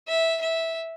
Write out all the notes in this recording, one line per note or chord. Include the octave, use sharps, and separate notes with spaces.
E5
E5